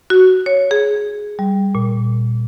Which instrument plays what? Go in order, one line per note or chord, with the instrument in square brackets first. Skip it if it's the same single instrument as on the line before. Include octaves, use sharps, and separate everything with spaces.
[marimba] F#4
C#5
G#4
G3
A#2